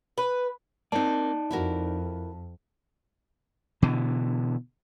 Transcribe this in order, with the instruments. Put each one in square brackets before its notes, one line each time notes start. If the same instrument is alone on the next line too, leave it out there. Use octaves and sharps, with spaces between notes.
[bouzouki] B4
[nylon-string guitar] A#3 C4 [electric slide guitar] D#4 D5 [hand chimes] A5
[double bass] F2 [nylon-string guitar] E4 F#4 A#4
[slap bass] B2 D3 E3